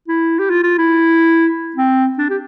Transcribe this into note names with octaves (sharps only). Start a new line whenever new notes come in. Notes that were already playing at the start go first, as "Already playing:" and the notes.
E4
G4
F4
F4
E4
C4
D4
G4